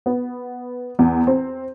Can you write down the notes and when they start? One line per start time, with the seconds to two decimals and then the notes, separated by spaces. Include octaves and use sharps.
0.06 B3
0.99 E2
1.27 C4